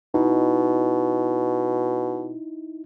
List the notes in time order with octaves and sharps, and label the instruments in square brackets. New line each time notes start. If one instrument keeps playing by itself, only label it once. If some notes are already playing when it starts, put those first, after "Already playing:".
[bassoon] B2 [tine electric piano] D#4 E4